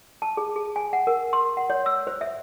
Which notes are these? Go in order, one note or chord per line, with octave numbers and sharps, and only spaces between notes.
A5
G#4
G#4
G#5
F#5
A#4
C6
F#5
C#5
E6
C5
E5